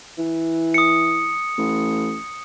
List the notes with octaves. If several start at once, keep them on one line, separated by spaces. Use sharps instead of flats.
E3
D#6 C#7
A1